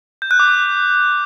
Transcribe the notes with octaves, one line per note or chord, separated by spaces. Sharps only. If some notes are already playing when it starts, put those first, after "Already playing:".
G6
F#6
D6
F#6